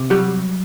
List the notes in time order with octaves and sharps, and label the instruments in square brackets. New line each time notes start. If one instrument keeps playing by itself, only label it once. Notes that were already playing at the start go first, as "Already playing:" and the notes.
Already playing: [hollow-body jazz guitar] C3
[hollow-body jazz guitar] F#3 [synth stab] G3